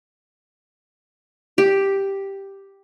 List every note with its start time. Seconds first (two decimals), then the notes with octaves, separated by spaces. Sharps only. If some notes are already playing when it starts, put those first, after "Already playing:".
1.58 G4